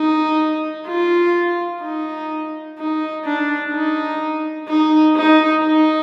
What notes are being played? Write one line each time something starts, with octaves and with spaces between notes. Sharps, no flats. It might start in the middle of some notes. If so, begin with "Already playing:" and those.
Already playing: D#4
F4
D#4
D#4
D4
D#4
D#4
D#4
D#4